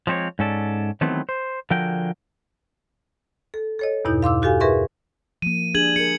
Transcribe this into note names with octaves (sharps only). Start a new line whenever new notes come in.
F3 G#3 C4 E4 C#5
G#2 C#4 A4 D5
D#3 E3 F#3 A3 B3 C4
C5
D3 F3 F#4 G#4 A#4 G5
A4
A4 C#5 D#5
E2 G2 B2 D#4 E4 G6
F5 C6 D6 E6
F#4 G4 A4 F5 G#5
G#4 A#4 B4 E5 C6 C#6
F3 A#3 D#7
D4 G4 G#4 G#6 F#7
G#4 A#4 C#7